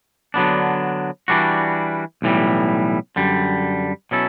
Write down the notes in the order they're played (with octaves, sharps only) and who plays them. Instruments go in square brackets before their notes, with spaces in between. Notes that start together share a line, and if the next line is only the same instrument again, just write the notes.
[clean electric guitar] D3 F#3 B3 D4
E3 G3 D4 F#4
B1 A2 E3 G3
F#2 D3 G3
B2 F#3 C#4 E4 A4